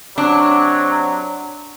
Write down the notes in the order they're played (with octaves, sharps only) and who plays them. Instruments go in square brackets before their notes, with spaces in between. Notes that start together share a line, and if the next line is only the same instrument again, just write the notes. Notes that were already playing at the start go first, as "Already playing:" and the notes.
[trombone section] C3 F#3 [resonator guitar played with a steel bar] D4